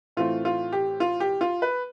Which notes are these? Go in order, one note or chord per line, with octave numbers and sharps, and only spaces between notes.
A2 E3 A3 C4 F4
F4
G4
F4
G4
F4
B4